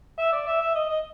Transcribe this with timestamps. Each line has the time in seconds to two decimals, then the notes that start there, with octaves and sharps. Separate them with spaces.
0.18 E5
0.32 D5
0.47 E5
0.61 E5
0.75 D#5
0.89 D#5